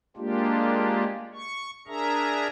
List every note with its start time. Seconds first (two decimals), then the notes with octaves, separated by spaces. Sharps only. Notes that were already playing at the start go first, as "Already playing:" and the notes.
0.17 G#3 A#3 D4 F4 G4
1.34 C#6
1.87 D4 G#4 A#4 E5 A#5